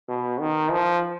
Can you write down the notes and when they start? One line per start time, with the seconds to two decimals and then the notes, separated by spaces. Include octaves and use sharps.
0.08 B2
0.40 D#3
0.71 F3